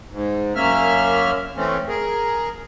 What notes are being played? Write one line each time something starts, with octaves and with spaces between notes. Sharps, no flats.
G#2
F#2 A#3 C#4 E5 F6
E3 A3 C4 C#4
G#4 A#4